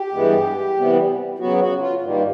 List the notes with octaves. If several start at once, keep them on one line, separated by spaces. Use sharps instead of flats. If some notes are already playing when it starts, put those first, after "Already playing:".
Already playing: G4
G2 E3 G#3 B3
C3 E3 G3 B3
C#3 F#3 B3 F#4
F#4
F4
G2 D#3 G3 A#3